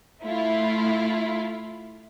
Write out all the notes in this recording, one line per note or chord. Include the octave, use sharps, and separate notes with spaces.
A3 E4 F4